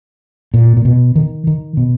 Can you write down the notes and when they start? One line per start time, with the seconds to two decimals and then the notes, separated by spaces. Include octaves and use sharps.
0.54 A#2
0.77 A#2
0.85 B2
1.16 D#3
1.47 D#3
1.77 B2